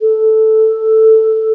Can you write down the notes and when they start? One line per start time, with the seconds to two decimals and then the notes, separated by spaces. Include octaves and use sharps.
0.01 A4